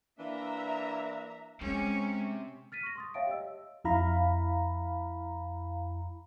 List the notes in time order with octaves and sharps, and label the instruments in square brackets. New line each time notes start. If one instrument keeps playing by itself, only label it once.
[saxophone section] E3 A#3 D4 [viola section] E5 A#5
[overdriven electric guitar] C3 [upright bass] G#3 [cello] C#4
[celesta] F6 A6 B6 D#7
C#6 A#6
C6 D#6 A6
C#5 E5 F5 G5 A5 D7
G4 D#5 E6
[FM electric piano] F2 E4 F5 A#5 B5